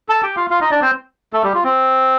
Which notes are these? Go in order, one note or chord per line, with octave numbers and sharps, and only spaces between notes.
A4 A5
G4 G5
F4 F5
F4 F5
D#4 D#5
D4 D5
C4 C5
A3 A4
G3 G4
F4
C4